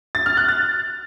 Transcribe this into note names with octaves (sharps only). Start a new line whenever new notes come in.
A6
F6
F#6
A6